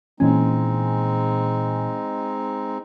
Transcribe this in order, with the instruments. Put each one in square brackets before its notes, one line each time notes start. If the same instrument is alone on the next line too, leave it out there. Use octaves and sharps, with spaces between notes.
[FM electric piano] A#2 E3 G#5 [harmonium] G#3 C4 D#4 [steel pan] C#4